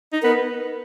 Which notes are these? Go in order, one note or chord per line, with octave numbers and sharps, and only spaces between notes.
D#4
B3 A#4